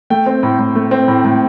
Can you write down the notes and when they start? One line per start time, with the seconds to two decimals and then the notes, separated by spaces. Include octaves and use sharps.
0.10 A3 G5
0.26 C4
0.43 A2
0.59 A2
0.75 A3
0.91 C4
1.08 A2
1.24 A2